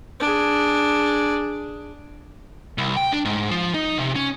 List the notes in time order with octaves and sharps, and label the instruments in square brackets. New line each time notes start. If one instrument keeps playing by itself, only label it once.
[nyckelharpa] D4 G#4
[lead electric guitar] C2
G5
D4
G#2
F3
D#4
C3
C#4